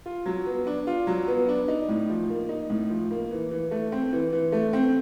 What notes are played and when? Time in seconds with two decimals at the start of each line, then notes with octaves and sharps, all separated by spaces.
0.06 F4
0.26 F#3
0.46 B3
0.67 D4
0.87 F4
1.07 F#3
1.28 B3
1.48 D4
1.68 D#4
1.89 A2
2.09 F3
2.30 A#3
2.49 D#4
2.70 A2
2.90 F3
3.11 A#3
3.31 E3
3.51 E3
3.71 A3
3.92 C4
4.13 E3
4.33 E3
4.52 A3
4.73 C4